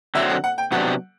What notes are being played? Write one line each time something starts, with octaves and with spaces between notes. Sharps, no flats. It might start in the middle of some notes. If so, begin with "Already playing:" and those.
D3 F#3 C4 E5
F#5
F#5
G5
C3 F#3 B3 D4 G4 F#5